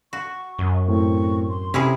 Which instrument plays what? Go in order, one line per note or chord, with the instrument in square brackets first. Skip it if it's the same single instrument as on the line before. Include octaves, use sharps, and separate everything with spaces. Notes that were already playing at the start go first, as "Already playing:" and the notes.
[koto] F#4 [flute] C#6
[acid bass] F#2
[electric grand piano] A2 C4 [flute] C#6
[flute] C6
[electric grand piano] C3 [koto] C#4 E4 G#4